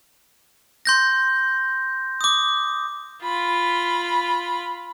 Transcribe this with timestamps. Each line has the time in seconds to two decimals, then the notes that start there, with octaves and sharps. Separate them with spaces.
0.86 C6 G6 A#6
2.21 D6 D#6
3.23 F4 B5